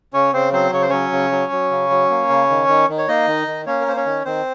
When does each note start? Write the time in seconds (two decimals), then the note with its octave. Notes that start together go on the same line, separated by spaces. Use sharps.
0.13 C#3 C#4 C#5
0.33 C#3 C4 C5
0.53 F#3 C4 C5
0.72 C#3 C#5
0.82 C5
0.89 F#3 C#4 C#5
1.12 C#3
1.32 F#3
1.52 F#3
1.71 C#3
1.90 F#3
2.10 A#3
2.30 C#3
2.50 D#3
2.68 D#3
2.89 D#3
2.98 C#5
3.08 A#3 D#4 D#5
3.28 D#3
3.47 D#3
3.66 A#3 C#4 C#5
3.81 A#4
3.87 A#3 C5
3.96 C#4 C#5
4.06 D#3
4.25 D#3 C4 C5